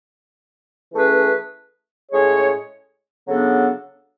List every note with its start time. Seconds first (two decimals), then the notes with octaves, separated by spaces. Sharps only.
0.93 E3 A3 C#4 G#4 B4
2.10 A2 G#3 C#4 G#4 C#5
3.28 C#3 F#3 B3 D4 A4